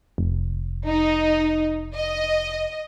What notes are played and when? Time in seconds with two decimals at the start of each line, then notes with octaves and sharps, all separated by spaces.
0.18 F1
0.87 D#4
1.95 D#5